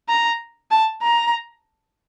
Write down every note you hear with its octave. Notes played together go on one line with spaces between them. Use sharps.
A#5
A5
A#5